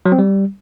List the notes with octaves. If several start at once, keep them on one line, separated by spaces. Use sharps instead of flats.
F#3
C4
G3